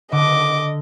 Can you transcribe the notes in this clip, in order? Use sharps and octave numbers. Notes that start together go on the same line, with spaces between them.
D3 D#5 D6